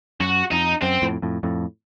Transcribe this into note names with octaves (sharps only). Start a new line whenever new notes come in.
F#2 F#4
F2 D#4
F#2 C4
F2 A2
F2 A2
F2 A2